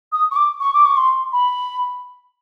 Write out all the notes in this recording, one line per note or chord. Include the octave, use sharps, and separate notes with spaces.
D#6
C#6
D6
C#6
D6
C#6
C6
B5